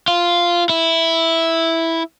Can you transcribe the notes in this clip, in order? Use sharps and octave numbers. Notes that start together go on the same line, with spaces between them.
F4
E4